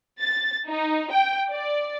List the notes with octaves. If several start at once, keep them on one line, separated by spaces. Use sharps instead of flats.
A6
D#4
G5
D5